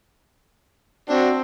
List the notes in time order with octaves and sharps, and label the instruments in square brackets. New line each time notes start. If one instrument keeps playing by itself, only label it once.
[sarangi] C4 [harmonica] D4 F#4